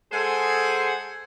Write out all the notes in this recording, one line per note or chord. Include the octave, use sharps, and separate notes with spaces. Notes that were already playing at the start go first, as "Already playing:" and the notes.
G#3 G#4 A4 C5 F#5 G#5